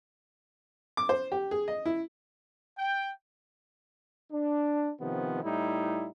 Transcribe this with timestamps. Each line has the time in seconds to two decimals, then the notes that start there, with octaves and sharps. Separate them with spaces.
0.97 D6
1.09 C5
1.32 G4
1.51 G#4
1.68 D#5
1.86 E4
2.78 G5
4.32 D4
5.00 C3 D#3 F3 B3
5.44 A2 G3 D#4 E4